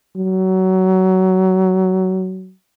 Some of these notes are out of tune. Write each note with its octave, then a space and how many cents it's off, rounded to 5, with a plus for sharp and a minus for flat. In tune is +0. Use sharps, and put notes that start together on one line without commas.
F#3 +20